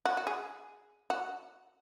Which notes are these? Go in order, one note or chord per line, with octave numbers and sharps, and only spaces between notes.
F#4
F#4
G#4
F#4